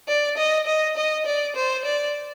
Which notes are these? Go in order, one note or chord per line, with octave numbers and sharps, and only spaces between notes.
D5
D#5
D#5
D#5
D5
C5
D5